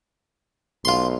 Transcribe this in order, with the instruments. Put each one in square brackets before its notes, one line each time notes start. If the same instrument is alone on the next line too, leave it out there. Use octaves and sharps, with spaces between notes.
[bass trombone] B1 [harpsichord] F4 C6